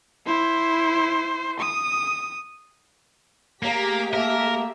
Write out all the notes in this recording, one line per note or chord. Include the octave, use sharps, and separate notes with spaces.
E4 C5
D#6
A3 A#3 G4 G#4 F5 A#5 B6
A#3 A4 A#4 E5